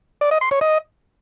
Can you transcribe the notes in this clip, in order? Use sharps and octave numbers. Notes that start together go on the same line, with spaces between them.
D5
D#5
C6
C#5
D#5